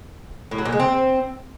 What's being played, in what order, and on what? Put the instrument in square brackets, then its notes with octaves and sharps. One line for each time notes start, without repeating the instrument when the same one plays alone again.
[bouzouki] A2
F#3
A#2
G#3
C4